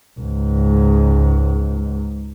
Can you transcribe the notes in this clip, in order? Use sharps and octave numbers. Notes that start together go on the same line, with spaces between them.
C#2 G#2